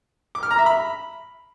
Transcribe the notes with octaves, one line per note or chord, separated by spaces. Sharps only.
D6
F6
A#5
E5
B5